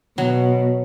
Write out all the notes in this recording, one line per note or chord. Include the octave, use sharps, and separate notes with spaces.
B2 F#3